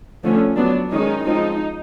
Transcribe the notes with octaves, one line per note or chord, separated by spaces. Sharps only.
D3 F3 A3 C#4
F#3 B3 D4
D#3 G#3 C#4 D#4
F3 G#3 C4 D#4